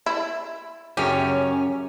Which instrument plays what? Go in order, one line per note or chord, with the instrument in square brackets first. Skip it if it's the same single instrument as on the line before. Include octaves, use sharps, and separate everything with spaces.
[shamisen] E4
[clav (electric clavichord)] F#2 G4 [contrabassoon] C#3 [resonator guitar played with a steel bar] C#4